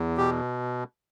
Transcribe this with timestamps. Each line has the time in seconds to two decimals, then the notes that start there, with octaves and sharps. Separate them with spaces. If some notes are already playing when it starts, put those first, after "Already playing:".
Already playing: E2
0.17 B2 G4